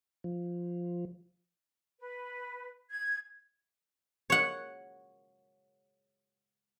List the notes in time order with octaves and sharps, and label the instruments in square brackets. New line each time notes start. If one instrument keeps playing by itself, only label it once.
[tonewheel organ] F3
[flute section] B4
G#6
[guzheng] C#5 F#5